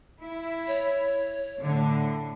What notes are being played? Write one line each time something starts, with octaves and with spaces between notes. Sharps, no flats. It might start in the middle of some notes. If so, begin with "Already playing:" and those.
E4
C#5
A2 D3